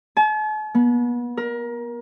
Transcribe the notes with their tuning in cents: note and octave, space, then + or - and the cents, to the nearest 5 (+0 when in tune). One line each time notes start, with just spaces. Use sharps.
A5 -45
B3 -35
A#4 +25